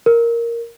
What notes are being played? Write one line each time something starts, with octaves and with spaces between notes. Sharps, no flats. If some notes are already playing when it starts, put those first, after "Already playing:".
A#4